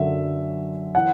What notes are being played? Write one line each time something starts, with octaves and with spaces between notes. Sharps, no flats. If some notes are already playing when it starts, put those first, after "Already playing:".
Already playing: F#2 D3 F#3 C#4 E5
E3 F#5